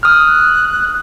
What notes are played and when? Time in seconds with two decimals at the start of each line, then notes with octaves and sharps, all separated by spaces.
0.03 D#6 F6 F#6